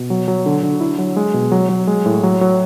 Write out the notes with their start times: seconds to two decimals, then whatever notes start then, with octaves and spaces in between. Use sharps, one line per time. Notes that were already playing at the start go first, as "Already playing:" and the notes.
Already playing: B2
0.10 F#3
0.28 F#3
0.46 D3
0.63 D3
0.80 E4
0.99 F#3
1.16 G#3
1.34 B2
1.52 F#3
1.69 F#3
1.87 G#3
2.06 A2
2.23 F#3
2.41 F#3